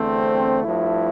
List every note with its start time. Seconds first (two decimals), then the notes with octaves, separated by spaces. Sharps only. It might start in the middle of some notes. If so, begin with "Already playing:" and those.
Already playing: E2 D3 A3 C4
0.63 G2 F3 A3 E4